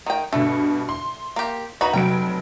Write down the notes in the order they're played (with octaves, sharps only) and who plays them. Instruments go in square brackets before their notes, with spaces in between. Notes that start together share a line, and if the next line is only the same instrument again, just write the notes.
[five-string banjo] D#3 G5
[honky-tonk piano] G2 B2 [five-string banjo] A3
[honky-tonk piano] C6
[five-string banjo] A#3 G4
[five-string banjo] D#4 F#4 B4 [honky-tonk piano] A#5
[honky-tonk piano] F1 F#3 D7 [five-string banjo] G5